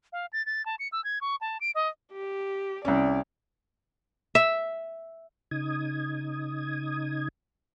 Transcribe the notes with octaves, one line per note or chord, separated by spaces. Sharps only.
F5
A6
A6
A5
C#7
E6
G#6
C#6
A5
D7
D#5
G4
C2 C#4 D5
E5
C#3 D#4 D#6 G#6